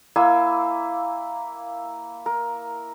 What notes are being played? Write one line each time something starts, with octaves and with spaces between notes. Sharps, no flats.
A#3 E4 G#5 E6
A#4